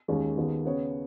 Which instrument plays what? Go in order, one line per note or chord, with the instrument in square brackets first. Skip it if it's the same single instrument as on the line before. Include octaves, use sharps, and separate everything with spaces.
[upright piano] D#2 D#3 G#3 C#4
D#2 D#3 G#3 B3
C#3 B3 G#4 C#5